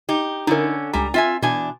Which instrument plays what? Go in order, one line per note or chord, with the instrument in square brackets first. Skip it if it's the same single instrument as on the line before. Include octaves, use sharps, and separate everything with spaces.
[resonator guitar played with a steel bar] D#4 G4
[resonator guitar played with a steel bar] D3 C#4 [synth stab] D#4 E4 A#4
[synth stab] C#2 G#5 A#5 [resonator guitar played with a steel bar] G3
[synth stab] C4 [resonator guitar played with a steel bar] F4 E5 G#5
[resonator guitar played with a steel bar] E2 D4 G#5 [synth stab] B2